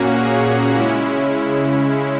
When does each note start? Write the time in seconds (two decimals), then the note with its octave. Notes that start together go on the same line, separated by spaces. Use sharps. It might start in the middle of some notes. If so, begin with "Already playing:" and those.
Already playing: A#2 A#3 C#4 F#4
0.21 G#4
0.75 C#3 G#3 C#4 E4